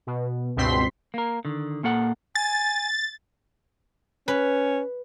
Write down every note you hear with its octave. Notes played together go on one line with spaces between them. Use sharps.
B2
C#2 G2 B2 C4 C6 B6
A#3 A#4
D3 D#3
A#2 A#3 A4 F#5
G#5 A6
C#4 B4